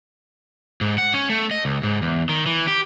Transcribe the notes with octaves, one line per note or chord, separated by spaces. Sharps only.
G#2
F#5
C#4
A3
D#5
C#2
G#2
E2
D#3
E3
G4